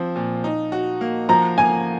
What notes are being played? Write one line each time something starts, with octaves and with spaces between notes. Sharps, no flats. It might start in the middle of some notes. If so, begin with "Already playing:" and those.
Already playing: F3 C4
A#2
D#4
F#4
A#3
F3 A#5
A#3 G#5